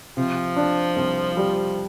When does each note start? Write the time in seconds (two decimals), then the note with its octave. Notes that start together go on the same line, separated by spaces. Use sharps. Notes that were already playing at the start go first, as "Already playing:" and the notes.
0.16 C3 F3
0.56 D4
0.96 C2
1.37 G3